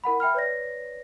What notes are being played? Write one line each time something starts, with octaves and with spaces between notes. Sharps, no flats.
E4 A#4 F#5 B5
E5 G5 B5 F6
B4 C#5 D5 A#6